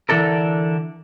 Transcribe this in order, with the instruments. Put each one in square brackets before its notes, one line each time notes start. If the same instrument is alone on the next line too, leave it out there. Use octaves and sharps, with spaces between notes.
[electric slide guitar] D3 E3 D4 D#4 A4 A#4